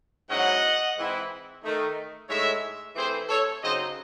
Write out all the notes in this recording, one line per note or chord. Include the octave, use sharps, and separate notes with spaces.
G#2 F#3 C#4 E4 D#5 F#5
G#2 E3 C4 E4
D#3 A3 D#4
A2 G#3 D#4 C#5 E5
E3 A3 C4 E4 G#4 C5
A4 C#5
C#3 F#3 C4 D#4 C5 D#5